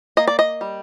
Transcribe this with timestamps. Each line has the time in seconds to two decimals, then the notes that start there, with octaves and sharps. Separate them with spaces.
0.17 A#3 D#5
0.27 D5
0.39 D#5
0.61 G3